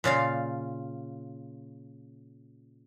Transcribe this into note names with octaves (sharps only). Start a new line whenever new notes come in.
A#2 C#3 D5 F5